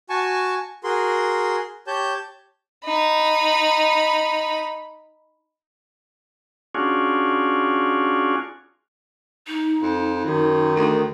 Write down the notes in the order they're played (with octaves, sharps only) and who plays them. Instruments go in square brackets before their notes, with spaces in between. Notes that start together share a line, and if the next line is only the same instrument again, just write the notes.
[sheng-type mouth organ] F#4 G#5 A5 C#6
F#4 G#4 A#4 C6
G4 C#5 A5 G6
[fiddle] D#4 B5
[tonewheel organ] C#4 D4 F4 F#4 G#4
[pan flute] D#4
[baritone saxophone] F2
[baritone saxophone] F#2 [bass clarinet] D#3
[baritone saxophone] D2